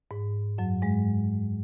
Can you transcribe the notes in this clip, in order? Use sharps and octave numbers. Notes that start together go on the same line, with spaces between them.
G#2
F#2 F#3
G#2 G#3